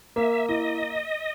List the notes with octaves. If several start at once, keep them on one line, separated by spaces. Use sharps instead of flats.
A#3 E5
E4 D#5